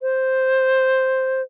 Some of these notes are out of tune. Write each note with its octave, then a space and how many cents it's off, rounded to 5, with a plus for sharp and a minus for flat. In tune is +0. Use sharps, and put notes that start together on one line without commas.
C5 +0